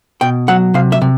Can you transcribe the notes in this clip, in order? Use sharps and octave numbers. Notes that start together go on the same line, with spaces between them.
B2 G5
F#3 F#5
C3 F5
E5
C3